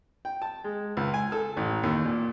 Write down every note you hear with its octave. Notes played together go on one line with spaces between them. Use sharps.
G5
A5
G#3
C#2
G#5
A4
A1
D#2
A#2